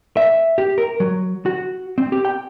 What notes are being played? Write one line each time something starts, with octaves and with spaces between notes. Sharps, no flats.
E5
G4
A#4
F#3
F#4
C4
G4
G5